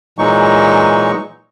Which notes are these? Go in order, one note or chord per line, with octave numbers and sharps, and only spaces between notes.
A#2 E3 F#3 G#3 D#4 C#6